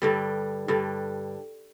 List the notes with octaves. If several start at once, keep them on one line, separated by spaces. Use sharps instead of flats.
G2 D3 G3
G2 D3 G3